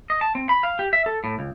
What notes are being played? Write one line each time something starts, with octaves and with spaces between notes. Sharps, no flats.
D#5
A5
C4
B5
F5
G4
E5
A4
A2
C#2